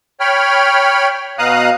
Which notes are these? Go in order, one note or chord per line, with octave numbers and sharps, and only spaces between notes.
C#5 G5 B5 F6
B2 F5 A#5 D#6 F#6